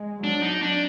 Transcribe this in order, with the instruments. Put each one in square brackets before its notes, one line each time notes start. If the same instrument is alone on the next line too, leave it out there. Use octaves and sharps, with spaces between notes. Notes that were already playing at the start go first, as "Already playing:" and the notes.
Already playing: [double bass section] G#3
[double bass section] F#3 [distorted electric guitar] D4
[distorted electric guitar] D#4
D4